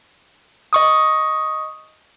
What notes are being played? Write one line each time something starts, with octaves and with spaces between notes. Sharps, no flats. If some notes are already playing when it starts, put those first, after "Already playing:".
D#5 C#6 D#6